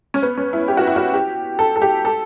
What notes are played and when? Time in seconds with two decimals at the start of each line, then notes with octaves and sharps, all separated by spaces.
0.14 C#4
0.23 B3
0.38 C#4
0.53 E4
0.68 G4
0.77 F#4
0.87 E4
0.96 F#4
1.14 G4
1.59 A4
1.76 A4
1.82 G4
2.05 A4